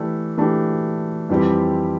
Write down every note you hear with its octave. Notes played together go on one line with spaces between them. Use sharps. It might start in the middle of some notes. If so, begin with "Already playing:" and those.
Already playing: E3 A3 D4 G4
E3 A3 D4 G4
F2 E3 G3 C4 G4